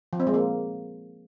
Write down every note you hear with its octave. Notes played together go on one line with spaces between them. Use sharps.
F3
C4
G#3
A#3